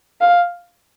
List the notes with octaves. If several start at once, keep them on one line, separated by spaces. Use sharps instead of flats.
F5